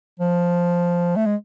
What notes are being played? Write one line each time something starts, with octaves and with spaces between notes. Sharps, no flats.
F3
A3
G#3